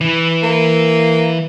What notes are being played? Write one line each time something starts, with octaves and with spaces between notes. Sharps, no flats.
E3
A#3